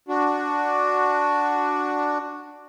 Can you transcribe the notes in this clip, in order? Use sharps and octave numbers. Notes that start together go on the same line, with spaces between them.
D4 F#4